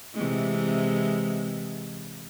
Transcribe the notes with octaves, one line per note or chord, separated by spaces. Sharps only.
C3 E3 G#3